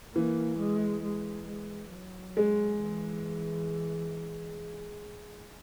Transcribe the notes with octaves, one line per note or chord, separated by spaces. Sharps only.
E3 A#3
G#3
G#3
G#3
F#3
G#3
E3